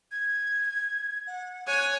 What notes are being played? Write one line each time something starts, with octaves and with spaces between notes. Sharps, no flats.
G#6
F#5
C#5 G#5 F#6